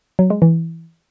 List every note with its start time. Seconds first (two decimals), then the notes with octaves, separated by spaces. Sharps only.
0.19 F#3
0.30 G#3
0.42 E3